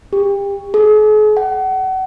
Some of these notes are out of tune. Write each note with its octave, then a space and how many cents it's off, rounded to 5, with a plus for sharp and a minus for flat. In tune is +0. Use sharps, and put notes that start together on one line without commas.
G4 +30
G#4 +45
F#5 +35